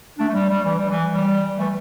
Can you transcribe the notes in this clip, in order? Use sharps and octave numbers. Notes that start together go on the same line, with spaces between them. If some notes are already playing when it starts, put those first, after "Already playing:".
A3 D4
A3
G3
G3
E3
G3
E3
G3
E3 A3